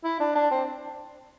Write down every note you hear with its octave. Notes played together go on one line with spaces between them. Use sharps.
E4
D4
D4
C4